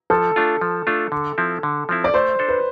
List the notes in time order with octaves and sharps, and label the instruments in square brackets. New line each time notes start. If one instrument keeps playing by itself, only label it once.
[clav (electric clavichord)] F3 [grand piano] A4
[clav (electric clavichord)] A3 D4 F4
F3
A3 D4 F4
D3
F3 C4 E4
D3
F3 C4 E4
[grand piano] D5
[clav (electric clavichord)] A3 [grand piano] C5
[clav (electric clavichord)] D4 A4 C5
[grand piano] B4